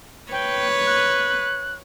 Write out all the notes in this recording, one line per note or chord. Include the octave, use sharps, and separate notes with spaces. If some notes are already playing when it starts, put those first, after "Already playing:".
B4 C#5 G5
F#6